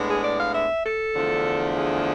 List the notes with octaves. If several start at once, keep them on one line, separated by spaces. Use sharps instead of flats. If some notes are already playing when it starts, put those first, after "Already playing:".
Already playing: A2 G#3 B3 D4
G#4
D5
F5
E5
A4
E2 D3 F3 A3 D4
G#4